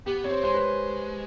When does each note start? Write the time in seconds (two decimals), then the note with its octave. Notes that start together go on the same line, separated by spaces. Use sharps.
0.06 B3 G4
0.24 C4 C#5
0.31 C5
0.43 G#3 C5
0.54 B4
0.60 G#3